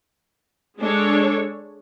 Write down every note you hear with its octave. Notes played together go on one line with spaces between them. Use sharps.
G#3 D4 A4 C#5